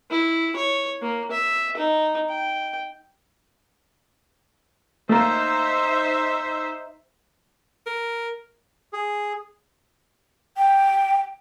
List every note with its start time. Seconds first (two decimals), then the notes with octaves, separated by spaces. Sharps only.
0.11 E4
0.56 C#5
1.02 A#3
1.31 E5
1.77 D#4
2.29 G5
5.09 A3 A#3 D#4 C5 E5
7.86 A#4
8.93 G#4
10.57 G5